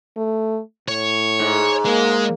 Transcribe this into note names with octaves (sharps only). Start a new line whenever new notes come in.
A3
A2 C#5
G#2
G#3 A#3